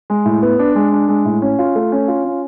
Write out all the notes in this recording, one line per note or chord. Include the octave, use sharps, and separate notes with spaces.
G#3
A2
B3
D4
G#3
D4
G#3
A2
C#4
F4
A3
C#4
F4
C#4